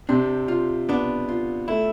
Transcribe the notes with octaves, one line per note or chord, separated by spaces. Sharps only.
C3 C4 D4
F4
B3 D4
F4
A3 E4